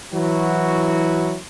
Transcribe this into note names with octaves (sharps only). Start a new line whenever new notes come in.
E3 F#3 E4 F#4